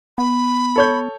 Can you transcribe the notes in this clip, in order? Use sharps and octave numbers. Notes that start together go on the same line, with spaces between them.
B3 B5
A4 C#5 G6